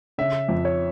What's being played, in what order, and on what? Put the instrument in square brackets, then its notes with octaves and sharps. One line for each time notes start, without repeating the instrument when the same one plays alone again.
[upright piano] C#3 [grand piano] E5
[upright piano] F2
[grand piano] C#5